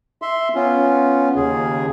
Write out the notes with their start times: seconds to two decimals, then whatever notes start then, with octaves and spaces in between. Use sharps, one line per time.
0.22 E5 C6
0.55 B3 C#4 F4
1.36 D#2 C#3 G#4